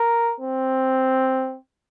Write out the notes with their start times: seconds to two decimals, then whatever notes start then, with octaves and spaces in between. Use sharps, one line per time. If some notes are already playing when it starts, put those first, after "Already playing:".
Already playing: A#4
0.40 C4